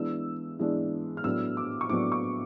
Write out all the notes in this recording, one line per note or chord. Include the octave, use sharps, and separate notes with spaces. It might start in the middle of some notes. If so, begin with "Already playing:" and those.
Already playing: E3 G#3 B3 D4 E6
E3 G#3 B3 D4
F6
A2 F#3 B3 D4 E6
D6
C#6
A2 F#3 B3 D4 D6
C#6